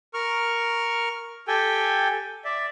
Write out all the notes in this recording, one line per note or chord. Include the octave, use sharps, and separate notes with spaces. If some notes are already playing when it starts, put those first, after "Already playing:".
A#4 C#6 F6
G4 A4 G5 G#5
D5 E5